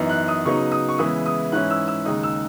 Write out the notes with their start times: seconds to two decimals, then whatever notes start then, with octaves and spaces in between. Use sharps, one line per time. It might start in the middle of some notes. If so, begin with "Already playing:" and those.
Already playing: F#2 E3 B3 D#4
0.09 F#6
0.28 D#6
0.45 C#3 F#3 B3 D#4 C#6
0.72 D#6
0.89 C#6
0.98 C#3 E3 G#3 B3 E4 D#6
1.26 D#6
1.52 G#2 E3 G#3 C#4 E4 F#6
1.70 E6
1.88 E6
2.05 D#2 C#3 G#3 D#4 D#6
2.23 E6